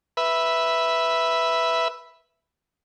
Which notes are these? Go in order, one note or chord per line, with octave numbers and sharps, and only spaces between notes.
B4 E5